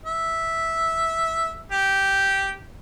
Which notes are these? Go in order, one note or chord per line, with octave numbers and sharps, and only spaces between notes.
E5
G4